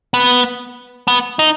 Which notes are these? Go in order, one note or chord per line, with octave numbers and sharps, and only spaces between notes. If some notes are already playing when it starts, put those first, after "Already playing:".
B3
B3
D#4